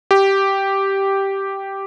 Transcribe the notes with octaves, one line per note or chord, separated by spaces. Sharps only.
G4